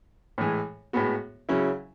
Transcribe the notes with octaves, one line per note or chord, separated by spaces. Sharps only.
A2 E3 G#3
A2 G#3 B3 F#4
C#3 F#3 C#4 E4